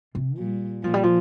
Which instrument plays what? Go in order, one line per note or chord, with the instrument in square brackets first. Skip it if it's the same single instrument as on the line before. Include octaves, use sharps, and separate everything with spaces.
[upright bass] C3
[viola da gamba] A#2 [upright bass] G3
[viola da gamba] A#2 [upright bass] F3
[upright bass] G3
F3